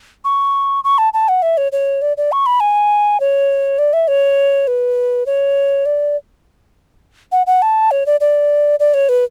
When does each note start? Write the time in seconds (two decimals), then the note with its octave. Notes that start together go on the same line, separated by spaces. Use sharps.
0.25 C#6
0.84 C#6
0.98 A5
1.13 A5
1.28 F#5
1.42 E5
1.57 C#5
1.72 C#5
2.02 D5
2.17 D5
2.32 C#6
2.46 B5
2.60 G#5
3.20 C#5
3.79 D5
3.93 E5
4.08 C#5
4.67 B4
5.26 C#5
5.86 D5
7.32 F#5
7.47 F#5
7.62 A5
7.91 C#5
8.06 D5
8.21 D5
8.80 D5
8.94 C#5
9.09 B4